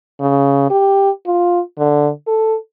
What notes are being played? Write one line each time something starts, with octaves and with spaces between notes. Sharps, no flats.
C#3
G4
F4
D3
A4